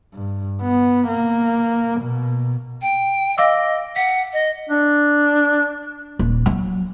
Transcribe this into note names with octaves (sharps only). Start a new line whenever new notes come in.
G2
B3
A#3
B2
G5
D#5 F5 D6 E6
F#5 B6
D#5
D4
D#1
F#3